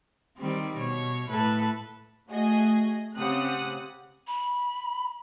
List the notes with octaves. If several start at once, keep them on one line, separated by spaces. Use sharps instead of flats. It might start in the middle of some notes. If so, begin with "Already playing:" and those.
D#3 G3 C4
B2 C#5
A2 A4 B4
A3 F#4 G#4 D#5
C#3 C4 G4 F#5 D#6 F#6
B5